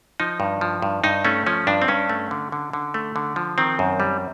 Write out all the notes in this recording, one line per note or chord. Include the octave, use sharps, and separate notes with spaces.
F3 D#4
G2
F3
G2
G2 D#4
A3 C#4
F3 C#4
G2 D4
C4
G2 C#4
A3
D3
D3
D3
A3
D3
F3
D#3 C4
F#2
G3